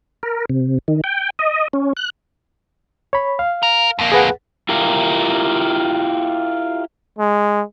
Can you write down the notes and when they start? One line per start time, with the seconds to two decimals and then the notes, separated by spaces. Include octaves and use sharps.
0.23 A#4
0.49 C3
0.88 D#3
1.04 G5
1.39 D#5
1.73 C#4
1.97 F#6
3.13 C#5 B5
3.39 F5
3.63 A#4
3.99 F2 A#3
4.12 G#4 B4 F#5
4.69 E4 F4 G4 A#4
7.19 G#3